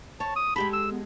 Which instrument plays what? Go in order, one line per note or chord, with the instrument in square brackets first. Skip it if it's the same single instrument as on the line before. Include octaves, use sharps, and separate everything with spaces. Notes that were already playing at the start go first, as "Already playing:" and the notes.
[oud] C#5 [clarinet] A5
[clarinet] D#6
[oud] G#3 G4 A4 [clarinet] B5
[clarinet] E6
B3